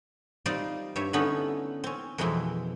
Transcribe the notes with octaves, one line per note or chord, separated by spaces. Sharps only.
G3 C4 D#4 F4 C5 D5
G2 G4 C#5 E5
D3 A3 B3 C#4 D#4 E4
C4 C#4
F2 B2 E3 G#3 C4 E4